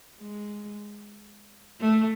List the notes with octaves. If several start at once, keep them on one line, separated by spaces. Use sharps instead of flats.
G#3
A3